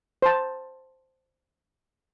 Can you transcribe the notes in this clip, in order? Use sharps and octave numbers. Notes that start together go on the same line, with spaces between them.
C5 A5